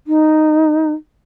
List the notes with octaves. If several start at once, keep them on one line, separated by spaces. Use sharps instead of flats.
D#4